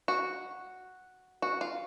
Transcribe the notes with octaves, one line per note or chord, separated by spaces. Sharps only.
F#4
F#4
F4